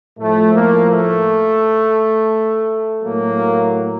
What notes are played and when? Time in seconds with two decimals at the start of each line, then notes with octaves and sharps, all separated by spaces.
0.18 A2 F3 A3
0.54 A#3
0.89 A3
3.03 A2 F#3 A#3